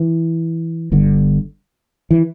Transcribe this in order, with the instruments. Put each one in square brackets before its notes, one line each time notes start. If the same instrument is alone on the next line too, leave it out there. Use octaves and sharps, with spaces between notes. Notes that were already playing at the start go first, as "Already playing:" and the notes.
Already playing: [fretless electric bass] E3
G1 G2 D3
E3